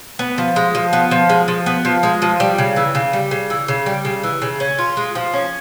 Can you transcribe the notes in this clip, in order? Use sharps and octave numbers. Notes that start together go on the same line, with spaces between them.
B3
F3
G#3
F3
B3
F3
G#3
F3
B3
F3
G#3
F3
G3
C#3
E3
C#3
G3
C#3
E3
C#3
G3
C#3
E3
C#3
C#4
F4
G#3
F3
C#4